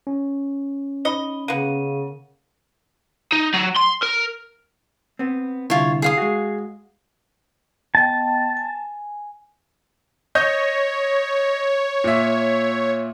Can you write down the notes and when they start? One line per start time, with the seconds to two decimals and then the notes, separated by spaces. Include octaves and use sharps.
0.07 C#4
1.05 D#4 D#5 B5 G7
1.48 C#3 A#3 B3 D#7
3.32 D#4
3.54 F#3
3.76 C6
4.03 A#4
5.19 B3 C4
5.70 C2 D3 E4 F4 C#5
6.02 G#4 F5 D#6
6.18 G#3 F#4
7.95 B3 D#5 G5 A5
8.57 G#5
10.35 C#5 D#5 G6
12.04 A#2 E5